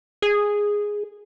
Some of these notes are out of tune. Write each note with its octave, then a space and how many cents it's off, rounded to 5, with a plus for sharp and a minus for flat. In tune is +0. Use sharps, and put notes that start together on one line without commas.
G#4 -5